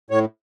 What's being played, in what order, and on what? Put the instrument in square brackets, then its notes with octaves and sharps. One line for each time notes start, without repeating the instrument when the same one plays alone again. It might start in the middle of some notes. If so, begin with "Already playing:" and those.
[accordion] A2 C#5